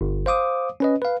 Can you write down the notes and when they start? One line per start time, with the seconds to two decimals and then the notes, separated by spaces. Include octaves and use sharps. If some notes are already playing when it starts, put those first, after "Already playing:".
0.01 G1
0.26 C5 F5 D6 D#6
0.80 C#4 B4 D#5
1.02 B4 F5